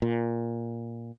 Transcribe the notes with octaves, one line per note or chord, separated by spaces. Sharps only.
A#2